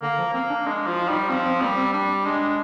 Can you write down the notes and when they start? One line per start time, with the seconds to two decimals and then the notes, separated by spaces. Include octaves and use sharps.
0.02 D3 A#3
0.18 F3
0.34 A#3 C4
0.49 D4
0.65 G#3 D4
0.86 F3 F4
1.01 F4
1.08 G3 D#4
1.29 F3 C4
1.45 C4
1.56 C4
1.61 G3 A#3
1.77 C4
1.93 G3 D4
2.25 G#3 D4